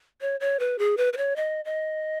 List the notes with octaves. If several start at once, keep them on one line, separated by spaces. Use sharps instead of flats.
C#5
C#5
B4
G#4
B4
B4
C#5
D#5
D#5